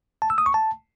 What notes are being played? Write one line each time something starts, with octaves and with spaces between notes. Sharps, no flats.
A5
E6
D#6
C#6
A5